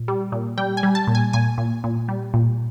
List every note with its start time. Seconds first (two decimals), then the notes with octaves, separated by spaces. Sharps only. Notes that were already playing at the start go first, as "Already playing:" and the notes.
Already playing: A#2
0.08 G3
0.32 A#2
0.58 G3 G5
0.77 G#5
0.83 G3
0.95 A5
1.07 A#2
1.15 G#5
1.33 A#2 G#5
1.58 A#2
1.84 A#2
2.08 G3
2.34 A#2